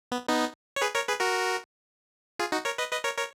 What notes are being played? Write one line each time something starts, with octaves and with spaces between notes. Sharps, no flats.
B3
B3 D#4
C#5
G#4 B4
A#4 C#5
G#4 B4
F#4 A#4
F4 G#4
D#4 F#4
A#4 C#5
B4 D#5
B4 D#5
A#4 C#5
A#4 C#5